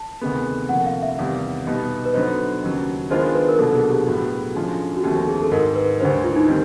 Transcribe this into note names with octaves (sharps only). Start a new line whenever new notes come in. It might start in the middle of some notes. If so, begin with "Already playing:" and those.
Already playing: A5
D2 C3 D#3 G#3 B3
D2 C3 F3 A#3 F#5
F5
E5
E2 C3 D#3 G3
B2 G3 B3 D#4
B4
D3 F#3 B3 D#4 C5
D#2 C#3 F#3
D#3 G#3 B3 D4 F4 C5
B4
A#4
C2 B2 F#3 A#3 D4 A4
G#4
G4
A2 F#3 B3 F#4
D3 F3 G#3 C#4 F4
F#4
D#2 D3 F3 A3 C4 G4
G#4
A4
G#2 D#3 G#3 A#4
B4
D2 D3 G3 C5
F4
E4
D#4
D#3 G3 C4